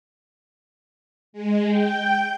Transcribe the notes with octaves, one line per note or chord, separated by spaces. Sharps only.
G#3
G5